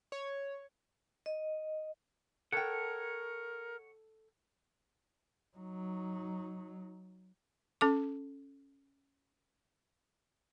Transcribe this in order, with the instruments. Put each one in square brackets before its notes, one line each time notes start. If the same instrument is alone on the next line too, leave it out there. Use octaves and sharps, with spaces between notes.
[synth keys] C#5
[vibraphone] D#5
[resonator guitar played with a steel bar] A4 G5 [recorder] A#4 [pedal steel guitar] C#5 F#5
[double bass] F#3 D#4
[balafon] C#4 A4 D6